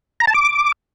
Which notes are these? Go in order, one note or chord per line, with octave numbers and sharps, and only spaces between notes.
A#5
A5
D6